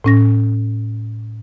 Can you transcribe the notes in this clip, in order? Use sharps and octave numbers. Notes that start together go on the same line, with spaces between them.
A2 C#4 A#6